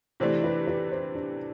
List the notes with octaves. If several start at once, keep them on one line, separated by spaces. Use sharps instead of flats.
C3 E3 A3 D4 C5
B4
B4
C5
D4